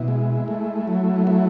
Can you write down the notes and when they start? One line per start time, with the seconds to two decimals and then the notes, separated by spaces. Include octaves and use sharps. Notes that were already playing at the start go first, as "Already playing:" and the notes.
Already playing: B2 E4
0.08 G#3
0.48 A3
0.88 F#3
1.27 A3 E4